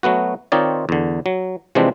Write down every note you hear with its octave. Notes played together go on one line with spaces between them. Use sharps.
F#3 A3 B3 F#4
D#3 C4 D#4 F4 C#5 D5
E2 D3
F#3
C3 E3 F3 G#3 C4 D4